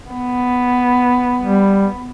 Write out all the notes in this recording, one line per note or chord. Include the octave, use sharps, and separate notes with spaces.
B3
G3